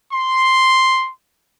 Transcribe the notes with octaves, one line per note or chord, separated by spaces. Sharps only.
C6